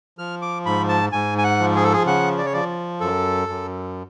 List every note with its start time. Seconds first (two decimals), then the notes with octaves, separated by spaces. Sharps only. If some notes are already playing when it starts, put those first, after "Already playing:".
0.18 F3 F6
0.42 D6
0.66 G#2 B5
0.89 A5
1.12 G#2 G#5
1.38 G#5
1.44 F#5
1.60 F3
1.75 G#4
1.84 A4
1.93 G#4
2.06 C#3 F#5
2.38 D5
2.45 C#5
2.53 F3 D5
3.01 F#2 A4
3.48 F#2